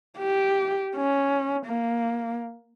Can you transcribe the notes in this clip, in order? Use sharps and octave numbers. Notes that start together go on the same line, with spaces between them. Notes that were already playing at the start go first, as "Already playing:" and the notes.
G4
C#4
A#3